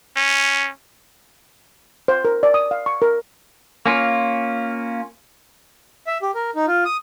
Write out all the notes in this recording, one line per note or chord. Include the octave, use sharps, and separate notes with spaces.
C#4
C5
A#4
D5
D#6
F5
C#6
A#4
A#3 C#4 F4
E5
G4
A#4
D#4
F4
D#6